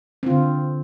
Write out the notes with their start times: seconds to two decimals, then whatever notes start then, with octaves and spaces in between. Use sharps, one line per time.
0.23 C4
0.26 F4
0.30 D3